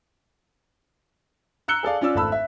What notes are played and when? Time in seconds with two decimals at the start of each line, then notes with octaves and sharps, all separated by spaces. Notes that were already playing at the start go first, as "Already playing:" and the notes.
1.68 A#5 E6 F#6 C#7 G7
1.83 G#4 A4 D5 F5
2.01 C#4 F4 D5 E6
2.15 G#1 A3 A5 B5 E6
2.32 E5